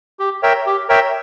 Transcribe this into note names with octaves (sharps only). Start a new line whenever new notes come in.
G4
A#4 C#5 E5 G5
G4
A#4 C#5 E5 G5